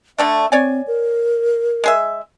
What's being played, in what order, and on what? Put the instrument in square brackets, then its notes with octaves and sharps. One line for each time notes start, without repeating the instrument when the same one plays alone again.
[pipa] D3 A3 D4 [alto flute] E5
[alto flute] C4 [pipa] C#5 D5 G#5
[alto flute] A#4
[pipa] G#3 G#4 E5